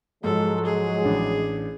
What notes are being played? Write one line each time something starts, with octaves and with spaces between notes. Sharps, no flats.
G#2 F3 F#3 G#3 A4
G#4
A1 D4